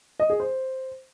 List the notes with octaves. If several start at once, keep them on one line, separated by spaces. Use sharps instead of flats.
D#5
G#4
C5